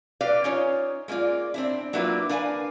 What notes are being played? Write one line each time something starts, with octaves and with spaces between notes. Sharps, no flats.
G4 B4 D5 F5
C#4 D#4 F4 C#5
G#3 A#3 E4 F4 D5
C4 D4 E4
F#3 A#3 D4 E4 F4 B4
D4 A#4 B4 F5 F#5 G#5